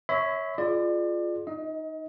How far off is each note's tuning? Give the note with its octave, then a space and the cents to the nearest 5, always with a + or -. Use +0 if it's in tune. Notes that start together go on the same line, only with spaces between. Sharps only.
C#5 +5 E5 -25 B5 +40
F4 +0 G#4 +30 D5 +30
D#4 +0 D#5 +30